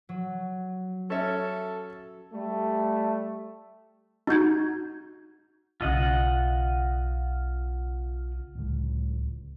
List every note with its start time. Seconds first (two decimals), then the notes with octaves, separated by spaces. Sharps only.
0.09 F#3
1.10 C#4 A4 E5
2.33 G3 A3
4.27 D#4 F#4 G6 G#6
5.81 B1 C#3 F4 D#5 F#5
8.55 D1 C#2